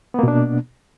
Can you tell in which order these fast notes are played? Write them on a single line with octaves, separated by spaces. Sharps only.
B3 A#3 B2 D4